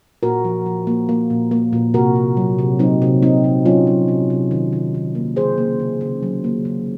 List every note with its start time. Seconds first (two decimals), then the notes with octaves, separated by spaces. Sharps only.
0.23 A#2 F#4 A#4
0.45 F3
0.66 F3
0.87 A#3
1.09 A#3
1.30 A#2
1.51 A#3
1.73 A#2
1.94 C3 F#4 A#4
2.16 C3
2.37 F#3
2.59 C3
2.79 F#3 C4 D#4
3.02 C3
3.23 C3 C4 D#4
3.44 C3
3.65 F#3 C#4 F4
3.87 F#3
4.08 C3
4.30 C3
4.51 D#3
4.73 D#3
4.94 D#3
5.15 A#3
5.36 C#3 G#4 C5
5.58 A#3
5.80 C#3
6.01 C#3
6.23 F#3
6.44 A#3
6.65 C#3